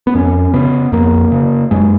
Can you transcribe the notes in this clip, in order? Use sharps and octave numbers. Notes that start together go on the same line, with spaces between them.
B3
F2 C#4
C#3 B3
F2 A#3
C#3
F#2 G#3